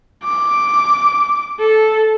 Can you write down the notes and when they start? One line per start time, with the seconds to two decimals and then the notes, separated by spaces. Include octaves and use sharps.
0.24 D6
1.59 A4